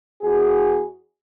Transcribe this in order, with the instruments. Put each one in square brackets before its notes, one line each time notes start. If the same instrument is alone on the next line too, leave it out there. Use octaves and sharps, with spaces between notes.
[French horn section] E2 F#4 G#4